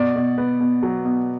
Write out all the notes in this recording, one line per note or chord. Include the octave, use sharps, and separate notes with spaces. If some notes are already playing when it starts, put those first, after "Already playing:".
Already playing: B2 D5
B2
B3
B2
F#3
B2